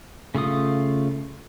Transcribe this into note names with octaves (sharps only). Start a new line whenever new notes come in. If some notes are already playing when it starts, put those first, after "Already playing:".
C#3 A3 F4 D#6